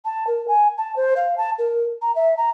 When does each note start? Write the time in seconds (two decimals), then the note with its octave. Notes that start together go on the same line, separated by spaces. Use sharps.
0.04 A5
0.27 A#4
0.47 G#5
0.77 A5
0.96 C5
1.16 F5
1.37 A5
1.58 A#4
2.01 A#5
2.15 E5
2.37 A#5